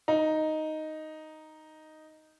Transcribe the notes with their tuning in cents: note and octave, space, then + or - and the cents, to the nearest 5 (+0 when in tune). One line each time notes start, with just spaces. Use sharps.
D#4 +0